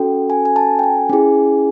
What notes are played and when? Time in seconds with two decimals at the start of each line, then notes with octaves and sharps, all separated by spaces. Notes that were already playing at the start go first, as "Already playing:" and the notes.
Already playing: C#4 F#4 A4 G5
0.30 G#5
0.45 G#5
0.56 A5
0.79 G5
0.83 G#5
1.09 C#4 E4 G#4